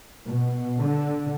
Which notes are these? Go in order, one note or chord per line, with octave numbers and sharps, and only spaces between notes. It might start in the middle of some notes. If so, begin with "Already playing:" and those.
B2
D3